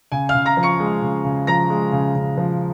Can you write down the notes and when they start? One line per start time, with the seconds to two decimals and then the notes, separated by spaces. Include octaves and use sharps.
0.12 C#3 G#5
0.29 F5 F6
0.35 C#3
0.46 A#5 A#6
0.57 F3
0.63 C#6 C#7
0.80 G#3
1.02 C#3
1.24 C#3
1.47 F3 A#5 A#6
1.70 G#3
1.92 C#3
2.16 C#3
2.37 F3